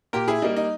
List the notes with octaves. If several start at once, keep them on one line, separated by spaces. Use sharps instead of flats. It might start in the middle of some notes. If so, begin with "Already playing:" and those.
A#2 G4 A#4
E4 G#4
G3 A#3 D#4
D#4